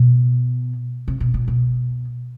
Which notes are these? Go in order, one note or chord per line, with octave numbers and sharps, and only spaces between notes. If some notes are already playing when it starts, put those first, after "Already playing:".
Already playing: B2
C3
B2
A#2
B2